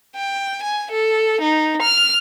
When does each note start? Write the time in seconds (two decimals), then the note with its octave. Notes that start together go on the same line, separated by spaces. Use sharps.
0.16 G5
0.63 G#5
0.91 A4
1.41 D#4
1.82 F6